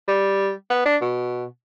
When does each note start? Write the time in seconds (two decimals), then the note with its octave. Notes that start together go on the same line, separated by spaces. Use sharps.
0.08 G3
0.70 B3
0.85 D4
1.02 B2